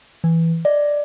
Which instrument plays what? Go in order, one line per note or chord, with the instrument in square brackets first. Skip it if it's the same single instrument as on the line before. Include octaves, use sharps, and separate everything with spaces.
[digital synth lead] E3
[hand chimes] D5 [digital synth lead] D#5